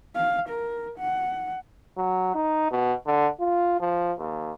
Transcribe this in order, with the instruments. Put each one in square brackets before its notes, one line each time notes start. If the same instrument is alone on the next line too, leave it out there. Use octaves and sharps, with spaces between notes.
[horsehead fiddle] F5
A#4
F#5
[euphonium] F#3
D#4
B2
D3
F4
F3
D#2